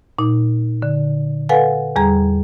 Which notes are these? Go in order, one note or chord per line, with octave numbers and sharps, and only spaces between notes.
A#2 D#4
D3
A4 B4 F5 F#5 G#5
E2 G3 G#4 A#5